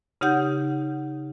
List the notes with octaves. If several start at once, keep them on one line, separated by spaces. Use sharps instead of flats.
C#3 D#4 G4 F#5 G6